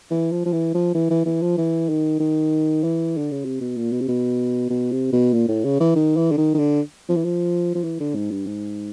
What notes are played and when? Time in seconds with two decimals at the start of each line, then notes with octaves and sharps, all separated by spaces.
0.11 E3
0.32 F3
0.45 F3
0.53 E3
0.74 F3
0.95 E3
1.10 E3
1.25 E3
1.42 F3
1.58 E3
1.89 D#3
2.20 D#3
2.83 E3
3.17 D3
3.31 C#3
3.45 C3
3.61 B2
3.77 A#2
3.92 B2
4.01 C3
4.08 B2
4.70 B2
4.92 C3
5.12 B2
5.33 A#2
5.48 A2
5.65 C#3
5.80 E3
5.95 D#3
6.17 E3
6.32 D3
6.37 D#3
6.54 D#3
6.59 D3
7.09 F3
7.16 E3
7.25 F3
7.75 F3
7.84 E3
8.00 D3
8.15 G#2
8.31 G2
8.46 G#2